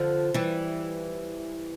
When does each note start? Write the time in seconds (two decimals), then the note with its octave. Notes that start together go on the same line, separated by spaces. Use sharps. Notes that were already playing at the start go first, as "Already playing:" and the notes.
Already playing: D3 F3
0.34 E3 G3